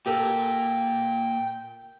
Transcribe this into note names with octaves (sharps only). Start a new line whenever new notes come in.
A#2 G4 A4 A#4 G5